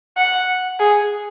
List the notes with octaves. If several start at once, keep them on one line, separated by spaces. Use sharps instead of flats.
F#5
G#4